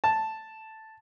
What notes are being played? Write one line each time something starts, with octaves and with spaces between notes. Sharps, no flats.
A5